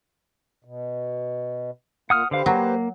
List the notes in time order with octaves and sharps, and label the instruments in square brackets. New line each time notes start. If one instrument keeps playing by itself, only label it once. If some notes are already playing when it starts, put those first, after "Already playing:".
[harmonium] B2
[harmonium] A#2 A#3 F4 [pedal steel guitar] F#5 D#6 F6
[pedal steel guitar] D3 F5 [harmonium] G4 B4 C5
[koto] F#3 [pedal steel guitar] A#3